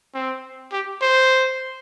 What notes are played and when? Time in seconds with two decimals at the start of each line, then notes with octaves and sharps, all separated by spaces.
0.14 C4
0.72 G4
1.01 C5